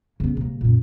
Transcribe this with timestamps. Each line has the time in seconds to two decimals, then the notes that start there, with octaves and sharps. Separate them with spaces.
0.20 C#3 B3
0.37 C3 A#3
0.61 F#2 A#2